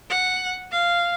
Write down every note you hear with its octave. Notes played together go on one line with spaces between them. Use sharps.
F#5
F5